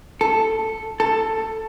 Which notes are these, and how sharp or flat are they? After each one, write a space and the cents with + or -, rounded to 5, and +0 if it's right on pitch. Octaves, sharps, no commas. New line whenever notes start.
A4 +5
A4 +10